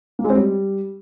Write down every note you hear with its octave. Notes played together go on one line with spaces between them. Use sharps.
A#3
G#3
C4
G3